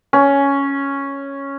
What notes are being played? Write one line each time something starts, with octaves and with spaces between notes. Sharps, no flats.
C#4